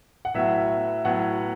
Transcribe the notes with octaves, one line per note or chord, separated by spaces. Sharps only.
F#5
A2 F#3 B3 E5
A2 F#3 B3 F#5